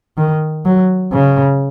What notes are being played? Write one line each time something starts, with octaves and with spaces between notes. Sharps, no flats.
D#3
F#3
C#3